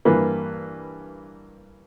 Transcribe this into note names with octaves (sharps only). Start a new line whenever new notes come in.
G2 E3 A#3 B4